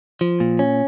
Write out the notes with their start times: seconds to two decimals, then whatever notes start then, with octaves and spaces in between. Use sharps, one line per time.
0.21 F3
0.40 A#2
0.59 C#4